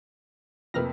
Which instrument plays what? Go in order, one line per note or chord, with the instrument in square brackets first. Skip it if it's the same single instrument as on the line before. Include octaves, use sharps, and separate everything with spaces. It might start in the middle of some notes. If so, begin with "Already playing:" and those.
[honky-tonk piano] F2 C3 A#3 [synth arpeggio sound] B4 F6 A#6